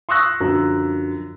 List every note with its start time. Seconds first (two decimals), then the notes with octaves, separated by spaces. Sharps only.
0.09 C6 C#6 D#6 E6 F#6 A#6
0.41 F#2 D3 F3